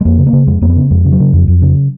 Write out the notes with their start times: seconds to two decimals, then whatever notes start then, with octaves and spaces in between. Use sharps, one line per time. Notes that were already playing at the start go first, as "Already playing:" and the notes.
0.01 G#3
0.05 F2 A#3
0.18 C#3
0.26 A#3
0.33 C#3
0.47 F2 G#3
0.61 F2 A#3
0.70 B3
0.76 C#3
0.91 F2 G#3
1.05 C#3
1.12 F#3
1.20 C#3
1.33 F2
1.48 F2
1.62 C#3